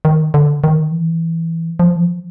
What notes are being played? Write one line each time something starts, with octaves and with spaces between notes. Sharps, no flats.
D#3
D3
D#3
E3
F3
E3
F3